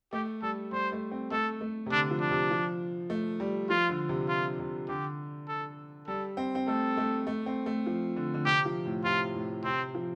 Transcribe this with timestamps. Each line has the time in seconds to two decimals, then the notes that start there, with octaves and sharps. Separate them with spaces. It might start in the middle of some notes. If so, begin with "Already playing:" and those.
0.13 A3 G4
0.42 G3 A4
0.72 G3 C5
0.92 A3
1.11 C4
1.31 A3 A4
1.61 A3
1.86 C3
1.91 D3 D4
2.11 F3
2.21 D4
2.31 C3
2.51 F3
3.10 A3
3.40 G3
3.70 F3 F4
3.89 D3
4.09 C3
4.29 F4
4.59 C3
4.89 D3 G4
5.48 A4
6.07 G3 A4
6.37 C4
6.55 C4
6.68 A3 A4
6.97 A3
7.27 A3
7.46 C4
7.66 A3
7.86 F3
8.16 D3
8.34 D3
8.45 C3 G4
8.65 F3
8.86 A2
9.05 C3 F4
9.35 A2
9.64 C3 C4
9.95 F3